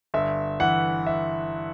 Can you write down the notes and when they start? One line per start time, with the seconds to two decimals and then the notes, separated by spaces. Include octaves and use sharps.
0.14 G1 E5
0.60 E3 F#5
1.07 E5